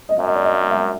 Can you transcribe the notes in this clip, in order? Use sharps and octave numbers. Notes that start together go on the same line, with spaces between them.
D#5
F#2 E5
D#5
D5
D#5
E5
E5